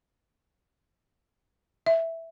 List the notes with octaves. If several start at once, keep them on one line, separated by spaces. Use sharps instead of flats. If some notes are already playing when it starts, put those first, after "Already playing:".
E5